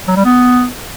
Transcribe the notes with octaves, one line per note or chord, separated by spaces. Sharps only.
F#3
G3
B3